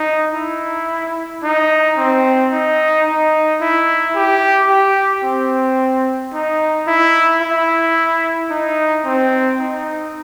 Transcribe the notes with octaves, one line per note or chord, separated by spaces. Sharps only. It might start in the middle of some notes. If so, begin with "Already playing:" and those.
Already playing: D#4
E4
D#4
C4
D#4
D#4
E4
G4
G4
C4
D#4
E4
E4
D#4
C4
D#4